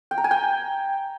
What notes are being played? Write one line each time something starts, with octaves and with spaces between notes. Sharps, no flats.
G5
A#5
G#5
G5